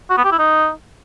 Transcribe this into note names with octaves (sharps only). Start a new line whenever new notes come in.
F#4
B3
G4
E4
D#4